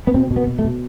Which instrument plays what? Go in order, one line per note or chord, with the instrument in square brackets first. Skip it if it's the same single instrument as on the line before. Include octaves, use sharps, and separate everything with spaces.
[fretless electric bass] B3
B2 C4
B2
B3
B2
A3
B2